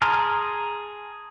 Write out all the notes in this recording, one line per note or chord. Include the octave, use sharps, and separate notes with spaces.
G#4 A5 A#5 C6 F6